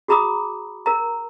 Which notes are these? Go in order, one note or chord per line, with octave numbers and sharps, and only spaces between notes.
F#4 G#4 A#5 B5 D6 D#6
A#4 A#5